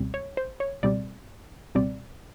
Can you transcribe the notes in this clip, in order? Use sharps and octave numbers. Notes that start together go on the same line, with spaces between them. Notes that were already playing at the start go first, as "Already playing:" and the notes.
Already playing: C#2 B2 G3 C4
C#5
C5
C#5
C#2 B2 G3 C4 D5
C#2 B2 G3 C4 D5